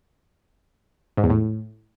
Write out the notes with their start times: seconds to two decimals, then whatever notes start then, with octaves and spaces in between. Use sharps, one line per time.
1.17 G#2
1.24 E2
1.30 A2